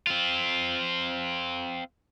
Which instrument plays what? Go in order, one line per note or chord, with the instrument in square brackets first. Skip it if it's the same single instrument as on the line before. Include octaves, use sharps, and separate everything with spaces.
[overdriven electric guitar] C4 F4